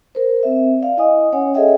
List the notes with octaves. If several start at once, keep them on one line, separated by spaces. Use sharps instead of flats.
A#4 C5
C4 E5
D5 F5
E4 D#5 G#5 D#6
C#4 C#5 F#5 G#5
G#4 A4 C#5 D#5 E5 G5